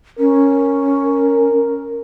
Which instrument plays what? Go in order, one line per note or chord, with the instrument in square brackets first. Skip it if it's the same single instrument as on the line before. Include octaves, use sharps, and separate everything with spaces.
[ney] C#4 [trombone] A#4